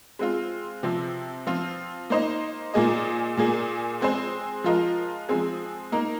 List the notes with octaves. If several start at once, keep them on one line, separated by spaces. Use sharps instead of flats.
G#3 C4 F4
C3 F3 C4
F3 C4 F4
A#3 D#4 C5 D#5
A#2 A#3 G#4 D#5
A#2 A#3 G#4
G#3 C4 G#4 C5
F3 G#3 F4 A#4 D#5
F3 G#3 C4 G#4
A#3 D#4 A#4